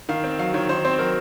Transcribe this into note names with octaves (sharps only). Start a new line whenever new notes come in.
D#3 F5
C4
F#3 F5
D#3 C#5
D#3 C5
C4 C5
F#3 A#4